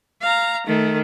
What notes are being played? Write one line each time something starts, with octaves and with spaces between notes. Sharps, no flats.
F5 A#5
D#3 A3